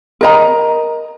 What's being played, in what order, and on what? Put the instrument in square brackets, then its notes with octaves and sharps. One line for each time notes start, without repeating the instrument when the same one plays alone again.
[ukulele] A#4 D#5 A#5